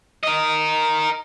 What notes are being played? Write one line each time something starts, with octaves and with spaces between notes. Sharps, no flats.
A#4 D#5